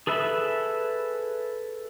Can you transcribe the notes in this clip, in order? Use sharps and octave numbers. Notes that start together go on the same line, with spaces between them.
G#4 A4 B4 E5 B5